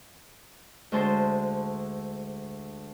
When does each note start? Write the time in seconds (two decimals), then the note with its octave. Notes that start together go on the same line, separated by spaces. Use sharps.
0.92 D2 G#3 C5 A5